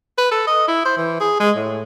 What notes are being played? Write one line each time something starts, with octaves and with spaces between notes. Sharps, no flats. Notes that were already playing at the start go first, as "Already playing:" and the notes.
B4
A4
D#5
E4
C5
E3
G#4
G#3
A2